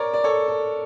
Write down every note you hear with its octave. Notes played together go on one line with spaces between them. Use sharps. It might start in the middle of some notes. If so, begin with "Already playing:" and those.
Already playing: A#4 C#5 D5
D5
A4 C#5
A4